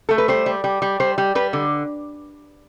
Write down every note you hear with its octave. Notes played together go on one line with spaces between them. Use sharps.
A3 A4
B4
G3 C5
G3
G3
G3
G3 C5
G3
G3 B4
D3